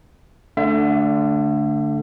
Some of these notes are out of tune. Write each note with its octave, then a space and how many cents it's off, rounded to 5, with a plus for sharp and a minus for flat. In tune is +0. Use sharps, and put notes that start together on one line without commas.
D3 +0 A3 +0 E5 +40